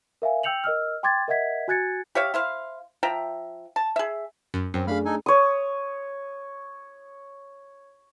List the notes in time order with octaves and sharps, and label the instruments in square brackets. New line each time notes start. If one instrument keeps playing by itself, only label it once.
[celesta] A#4 E5 F5 G#5
G5 E6 G6 C#7 F7 F#7
A#4 D#5 E6 F6
G5 C6 D6 G#6 A6
A#4 D#5 E5 F#5 G#6 B6
F#4 G#5 F#6 G#6 A6 C#7
[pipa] G4 C#5 E5 F5
E4 C5 F5
F3 E5 G5 A#5
A5
G#4 E5
[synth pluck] F#2
[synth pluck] F#2 [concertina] C4
[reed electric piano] A3 D4 G#4 [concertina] F5 B5 F6
[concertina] D#4 A4 G#5
[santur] C#5 D#6